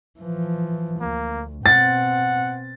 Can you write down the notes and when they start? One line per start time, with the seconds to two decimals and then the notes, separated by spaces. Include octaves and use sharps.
0.20 E3 F3
1.01 D2 A#3
1.66 B2 C4 F#5 A6